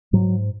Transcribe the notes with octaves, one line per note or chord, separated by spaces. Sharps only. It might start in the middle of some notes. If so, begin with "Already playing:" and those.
G#2 F#3